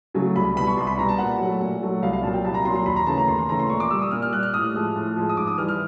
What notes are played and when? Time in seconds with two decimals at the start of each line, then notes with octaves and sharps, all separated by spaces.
0.14 C#3 F#3 A3
0.35 C2 B5
0.56 B2 G3 B5
0.67 C#6
0.77 C2 C6
0.87 B5
0.98 B2 G3 A#5
1.09 A5
1.18 A#2 F#5
1.39 F#3 A3
1.61 A#2
1.82 F#3 A3
2.02 C2 F5
2.13 F5
2.23 A#2 F#3 A5
2.33 G5
2.44 C2 A5
2.54 A#5
2.65 A#2 F#3 C6
2.75 C6
2.86 D#2 B5
2.96 A#5
3.07 C#3 E3 A3 A5
3.18 A#5
3.28 D#2 C6
3.39 C6
3.49 C#3 E3 A3 A#5
3.59 C6
3.69 A#2 C#6
3.80 D6
3.90 G3 E6
4.02 D#6
4.11 A#2 F6
4.22 F6
4.32 G3 F#6
4.43 F6
4.54 A2 D#6
4.74 F3 G#3
4.96 A2
5.16 F3 G#3
5.29 D#6
5.37 G#2 D6
5.47 D#6
5.58 E3 G3 F6
5.68 F6